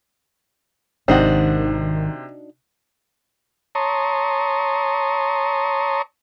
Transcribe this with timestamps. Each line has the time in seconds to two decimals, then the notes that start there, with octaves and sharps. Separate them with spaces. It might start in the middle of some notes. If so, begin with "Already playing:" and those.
1.08 G#1 C3 D#3 D4 D#4 F#4 C5
3.75 C#5 A5 A#5 C6 C#6 D#6